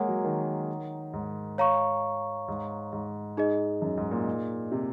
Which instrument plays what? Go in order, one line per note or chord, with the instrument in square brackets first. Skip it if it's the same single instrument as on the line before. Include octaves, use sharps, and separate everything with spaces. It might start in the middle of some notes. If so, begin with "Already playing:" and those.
Already playing: [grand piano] G#3 A#3 [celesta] C#5 F#5 A#5
[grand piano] F#3
D#3
G#2
[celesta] C#5 F5 A#5 C#6
[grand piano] G#2
G#2
[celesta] D#4 G#4 D#5
[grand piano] F#2
G#2
A#2
C3